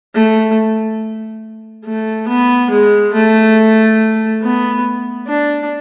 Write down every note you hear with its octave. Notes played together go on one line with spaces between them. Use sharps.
A3
A3
B3
G#3
A3
B3
D4